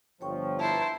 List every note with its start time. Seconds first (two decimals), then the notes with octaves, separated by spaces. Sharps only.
0.21 G1 F3 C#5 G5 C#6
0.59 E4 B4 C5 E5 A5 A#5